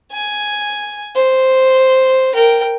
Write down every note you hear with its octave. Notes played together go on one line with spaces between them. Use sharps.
G#5
C5
A#4 G5